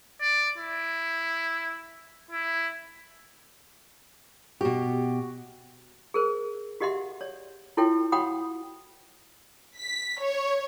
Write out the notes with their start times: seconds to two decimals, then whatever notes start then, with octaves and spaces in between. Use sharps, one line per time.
0.21 D5
0.58 E4
2.31 E4
4.61 B2 F#4 G4
6.14 G#4 A#4 C5
6.80 F#4 G4 D#5 E5 F#5 C6
7.21 C#5 D5
7.77 E4 F4 A4 C#5 G5
8.12 F#4 C#5 F#5 G5 B5 D#6
9.79 B6
10.21 C#5